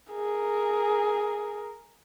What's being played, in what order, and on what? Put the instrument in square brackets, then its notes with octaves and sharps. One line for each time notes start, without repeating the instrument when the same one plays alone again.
[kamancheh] G#4 A#4